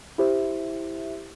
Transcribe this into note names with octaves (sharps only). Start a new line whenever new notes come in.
E4 G4 C5 E5